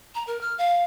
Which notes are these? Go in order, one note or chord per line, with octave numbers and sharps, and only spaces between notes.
A#5
A#4
F6
F5